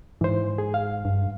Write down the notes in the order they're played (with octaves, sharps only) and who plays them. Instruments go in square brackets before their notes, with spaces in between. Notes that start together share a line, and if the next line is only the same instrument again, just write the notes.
[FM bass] G#2 [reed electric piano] E3 C5
[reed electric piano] G#4
F5
[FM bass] G2